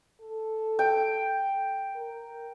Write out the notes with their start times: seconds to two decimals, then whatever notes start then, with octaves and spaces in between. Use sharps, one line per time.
0.21 A4
0.79 G5
1.96 A#4